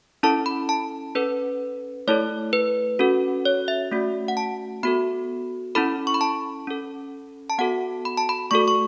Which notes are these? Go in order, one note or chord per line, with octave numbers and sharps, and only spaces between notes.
C#4 E4 A4 A5
B5
A5
C#4 A4 B4
A3 E4 A4 C#5
B4
C#4 F#4 A4
C#5
E5
A3 C#4 F#4
F#5
A5
B3 F#4 A4 B5
C#4 E4 A4 B5
C#6
B5
A5
C#4 A4
A5
B3 F#4 A4 F#5
B5
A5
B5
A3 F#4 A4 C#6
C#6